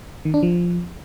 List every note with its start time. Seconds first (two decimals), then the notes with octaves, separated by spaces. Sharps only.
0.25 D#3
0.34 D4
0.43 F3